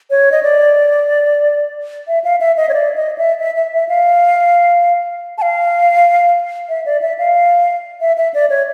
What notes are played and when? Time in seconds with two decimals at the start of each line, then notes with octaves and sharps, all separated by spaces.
0.10 C#5
0.32 D#5
0.43 D5
2.08 E5
2.24 F5
2.41 E5
2.57 D#5
2.69 C#5
2.74 D5
2.96 D#5
3.18 E5
3.40 E5
3.56 E5
3.73 E5
3.89 F5
5.38 A5
5.42 F5
6.69 E5
6.86 D5
7.01 E5
7.19 F5
8.01 E5
8.17 E5
8.34 D5
8.50 C#5